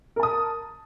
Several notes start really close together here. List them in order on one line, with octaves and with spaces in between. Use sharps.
A#4 A5 D#6